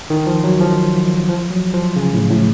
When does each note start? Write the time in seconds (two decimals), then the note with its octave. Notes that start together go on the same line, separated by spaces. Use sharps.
0.10 D#3
0.27 F3
0.44 F#3
0.61 F3
1.29 F3
1.50 F#3
1.74 F3
1.96 C#3
2.13 A2
2.30 A2